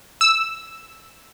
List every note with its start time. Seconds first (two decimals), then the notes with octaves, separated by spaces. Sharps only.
0.21 E6